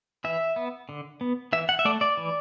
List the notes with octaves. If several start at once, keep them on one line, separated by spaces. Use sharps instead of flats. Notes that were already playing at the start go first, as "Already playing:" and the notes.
E3 E5
B3
D3
B3
E3 E5
F#5
E5
A3 D5
D5
E3